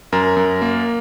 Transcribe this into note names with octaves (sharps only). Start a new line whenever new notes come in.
F#2 A#4
F#2
A#3